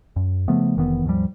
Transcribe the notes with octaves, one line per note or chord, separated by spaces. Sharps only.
F#2
C#3 F3 A3 B3
F1 D#3 E3 B3
D#2 G#2 F3 G3